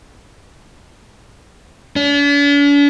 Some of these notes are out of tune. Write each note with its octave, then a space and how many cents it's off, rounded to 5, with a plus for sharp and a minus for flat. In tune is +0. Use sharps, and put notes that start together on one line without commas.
D4 -45